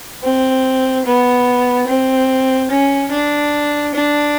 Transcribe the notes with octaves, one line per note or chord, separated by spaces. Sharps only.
C4
B3
C4
C#4
D4
D4